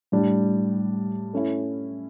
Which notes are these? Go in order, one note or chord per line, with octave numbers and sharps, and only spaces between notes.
A2 G3 D4 G4
A3 C#4 E4